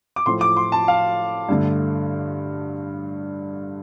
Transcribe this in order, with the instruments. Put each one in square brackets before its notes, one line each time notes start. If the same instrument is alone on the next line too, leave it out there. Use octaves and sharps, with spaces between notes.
[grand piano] D6
A2 F3 A3 C6
D6
C6
A5
F5
G2 D3 A3